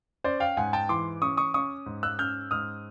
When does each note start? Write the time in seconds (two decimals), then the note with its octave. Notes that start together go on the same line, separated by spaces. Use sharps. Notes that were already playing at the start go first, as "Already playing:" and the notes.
0.24 C#4 C5 D5
0.40 F5 G5
0.57 G#2 F#5 G#5
0.73 G5 A5
0.89 E3 C6 D6
1.22 C#4 C#6 D#6
1.37 C#6 D#6
1.54 C#4 C#6 D#6
1.86 G#2
2.03 E6 F#6
2.19 C#4 F6 G6
2.51 G#2 D#6 F6